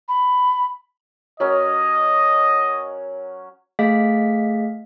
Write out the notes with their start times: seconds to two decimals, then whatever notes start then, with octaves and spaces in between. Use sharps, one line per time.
0.09 B5
1.40 F#3 C#4 A#4 D#5
3.79 A3 G#4 D#5 F5 B6